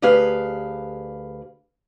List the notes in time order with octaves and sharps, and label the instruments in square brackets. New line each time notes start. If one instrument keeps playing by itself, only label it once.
[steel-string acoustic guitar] D2 G4 G#4 B4 F5